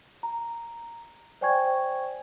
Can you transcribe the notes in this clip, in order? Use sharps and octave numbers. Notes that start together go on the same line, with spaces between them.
A#5
C5 D5 G5 G#5 C#6 G#6